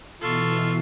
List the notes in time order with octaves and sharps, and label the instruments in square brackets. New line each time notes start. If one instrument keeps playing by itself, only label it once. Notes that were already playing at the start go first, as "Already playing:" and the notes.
[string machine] B2 E3 [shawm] F4 [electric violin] A4 C#6